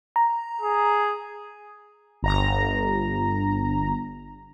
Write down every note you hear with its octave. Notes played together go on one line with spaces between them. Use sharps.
A#5
G#4
G1 A#5